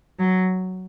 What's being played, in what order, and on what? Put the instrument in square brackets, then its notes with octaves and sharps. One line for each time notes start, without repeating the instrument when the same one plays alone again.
[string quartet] F#3